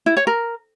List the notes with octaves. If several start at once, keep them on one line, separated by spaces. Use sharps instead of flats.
E4
C#5
A#4